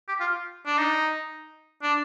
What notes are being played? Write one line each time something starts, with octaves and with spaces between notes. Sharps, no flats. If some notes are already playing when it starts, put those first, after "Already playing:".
G4
F4
D4
D#4
D4